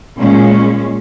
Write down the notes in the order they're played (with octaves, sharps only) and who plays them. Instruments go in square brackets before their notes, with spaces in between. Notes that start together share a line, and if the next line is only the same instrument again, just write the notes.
[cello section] A#2 G#3 C#4